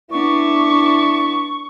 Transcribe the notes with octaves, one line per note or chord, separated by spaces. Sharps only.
B3 D4 E4 C#6